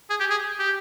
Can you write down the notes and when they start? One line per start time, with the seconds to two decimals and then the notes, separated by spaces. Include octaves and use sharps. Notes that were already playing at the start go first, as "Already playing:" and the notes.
0.10 G#4
0.20 G4
0.31 G#4
0.59 G4